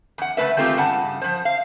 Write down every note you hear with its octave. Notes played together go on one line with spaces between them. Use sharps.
E2 F#5
C#3 A3 B4 E5
D#3 G#3 A3 C4 F4 G4
G2 C#3 F#5 A5
F3 C5
F5